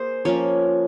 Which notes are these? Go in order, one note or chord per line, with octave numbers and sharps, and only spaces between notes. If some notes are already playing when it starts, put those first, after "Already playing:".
Already playing: A#3 G#4 C5
F3 A#3 C#4 C#5